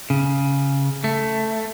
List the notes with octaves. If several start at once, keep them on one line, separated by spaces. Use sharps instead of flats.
C#3
A3